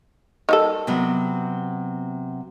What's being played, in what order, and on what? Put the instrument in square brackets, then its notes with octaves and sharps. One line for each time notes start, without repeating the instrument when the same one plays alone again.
[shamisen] D#3 G3 A4
[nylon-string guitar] C3 F#3 B3